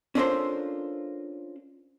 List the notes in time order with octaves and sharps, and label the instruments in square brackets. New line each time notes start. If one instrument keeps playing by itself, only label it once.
[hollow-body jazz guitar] C#4 D4 F4 A4 A#4 C5